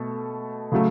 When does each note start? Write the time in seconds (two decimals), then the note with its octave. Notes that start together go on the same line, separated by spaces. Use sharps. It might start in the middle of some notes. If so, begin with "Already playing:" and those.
Already playing: B2 A3 A4
0.72 C#3 F#3 A3